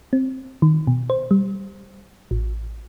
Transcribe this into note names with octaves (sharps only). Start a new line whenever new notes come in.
C4
D#3
B2
C5
G3
A1